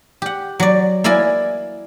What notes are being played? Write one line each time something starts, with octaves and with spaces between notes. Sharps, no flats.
G4 F#5
F#3 D5
A#3 E4 A#4 D5 G#5